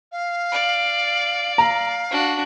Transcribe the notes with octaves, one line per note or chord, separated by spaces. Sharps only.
F5
D5
F5 A#5
D4 F#4